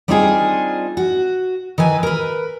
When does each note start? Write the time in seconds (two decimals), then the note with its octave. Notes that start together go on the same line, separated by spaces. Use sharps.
0.08 G3 C4 D4 D#4 F4 G#4
0.97 F#4
1.78 D#3 E3 B4 G#5
2.03 A#4 B4